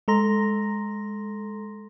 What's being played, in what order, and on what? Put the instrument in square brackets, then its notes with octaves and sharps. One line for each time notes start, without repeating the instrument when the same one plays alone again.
[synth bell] G#3 A4 A#5 C6 A#6